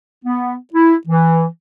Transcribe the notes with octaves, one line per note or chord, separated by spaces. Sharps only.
B3
E4
E3